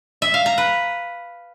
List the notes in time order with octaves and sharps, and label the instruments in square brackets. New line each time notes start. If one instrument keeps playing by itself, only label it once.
[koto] E5
F5
A#5
B4